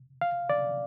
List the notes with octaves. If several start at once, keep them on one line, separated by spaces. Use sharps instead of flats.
F5
D5